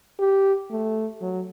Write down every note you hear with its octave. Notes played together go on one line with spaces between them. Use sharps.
G4
A3
F#3